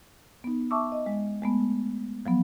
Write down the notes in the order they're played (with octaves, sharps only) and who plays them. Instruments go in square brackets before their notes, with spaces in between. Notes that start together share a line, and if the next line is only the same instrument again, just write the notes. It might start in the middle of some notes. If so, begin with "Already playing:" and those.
[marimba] B3 D#4
E5 A5 C#6 D6 E6
D#5
G#3
G#3 A3 B3
F3 F#3 B3